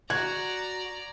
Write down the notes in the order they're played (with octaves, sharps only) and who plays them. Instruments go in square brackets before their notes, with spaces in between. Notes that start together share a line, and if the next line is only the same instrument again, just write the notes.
[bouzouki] F#4 [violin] D5 A#5 [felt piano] G#6